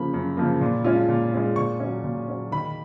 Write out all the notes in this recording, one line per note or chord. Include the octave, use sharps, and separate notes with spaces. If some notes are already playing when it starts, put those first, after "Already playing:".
Already playing: C#3 F3 A#3 B5
F#2
C#3 F3 A#3
A#2
G#3 C#4 F4
A#2
G#3 C#4 F4
A#2 C#6
F#3 C#4
A#2
F#3 C#4
D#3 B5